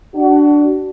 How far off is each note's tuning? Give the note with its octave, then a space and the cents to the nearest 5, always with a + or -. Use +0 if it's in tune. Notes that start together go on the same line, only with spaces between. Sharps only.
D4 +0 F#4 +25